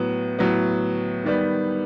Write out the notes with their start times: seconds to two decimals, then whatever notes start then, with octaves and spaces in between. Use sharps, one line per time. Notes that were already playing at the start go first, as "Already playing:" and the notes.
Already playing: A2 F#3 B3
0.39 A2 F#3 B3
1.24 D#3 G3 B3